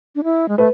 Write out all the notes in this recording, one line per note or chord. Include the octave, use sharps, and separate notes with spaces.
D4
E4
G#3
A3 B4